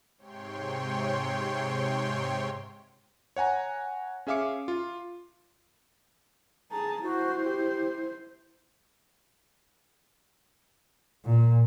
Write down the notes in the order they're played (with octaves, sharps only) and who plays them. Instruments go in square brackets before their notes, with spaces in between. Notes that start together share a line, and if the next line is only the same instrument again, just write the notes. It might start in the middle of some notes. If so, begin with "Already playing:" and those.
[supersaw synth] G#2 C3 C#5 G5 C6
[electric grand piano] C#5 F#5 G#5 A#5
C#4 G#4 E5 F5 D6 C#7
F4
[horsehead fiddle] G#4 A5 [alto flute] A#5
[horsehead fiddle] E4 C5 [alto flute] F#4
[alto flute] G4
[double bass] A#2